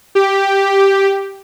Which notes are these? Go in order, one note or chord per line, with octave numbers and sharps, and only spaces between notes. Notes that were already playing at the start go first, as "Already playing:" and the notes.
G4